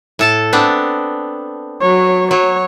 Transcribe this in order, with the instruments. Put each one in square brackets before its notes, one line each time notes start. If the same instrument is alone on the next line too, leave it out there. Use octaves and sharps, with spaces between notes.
[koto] A2 A4 A5
B3 C4 D4
[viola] F#3 C#5
[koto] F#3 [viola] C#5